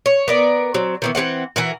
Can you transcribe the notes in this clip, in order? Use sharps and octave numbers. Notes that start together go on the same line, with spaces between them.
C#5
B3 A#4 D5
F#3 C4
D#3 E3 B3
E3 G#3 C4 F#5
E3 F#4 A#4